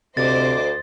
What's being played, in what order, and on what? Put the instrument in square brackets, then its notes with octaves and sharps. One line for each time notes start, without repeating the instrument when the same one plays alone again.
[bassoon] D2 [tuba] C3 [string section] C5 D#5 D6 [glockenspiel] A6